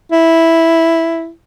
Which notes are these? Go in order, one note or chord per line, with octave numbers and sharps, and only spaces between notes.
E4